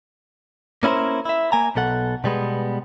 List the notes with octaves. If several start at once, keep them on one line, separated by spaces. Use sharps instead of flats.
A#3 C#4 E4 F#4 A#4 C5
E4 E5
A#3 G#5 A#5
B1 B2 A4 F#5
B2 G3 G#3 B3